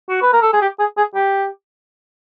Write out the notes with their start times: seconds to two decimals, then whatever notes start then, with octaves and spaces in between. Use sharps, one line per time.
0.09 F#4
0.22 B4
0.33 A#4
0.42 A4
0.53 G#4
0.62 G4
0.79 G#4
0.97 G#4
1.15 G4